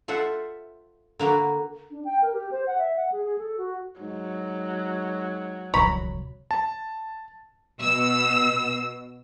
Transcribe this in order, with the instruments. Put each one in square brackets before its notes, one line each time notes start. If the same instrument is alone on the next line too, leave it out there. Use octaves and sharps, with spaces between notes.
[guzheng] F4 A4 C5 E5 F#5
D3 A#3 F#4 B5
[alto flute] D4
G5
A#4
G4
C5
F#5
E5
F#5
G#4
G#4
A4
F#4
[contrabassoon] G#2 [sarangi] F#3
[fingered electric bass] D1 C2 F2 [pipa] C#5 A#5 B5
[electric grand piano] A5
[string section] B2 E6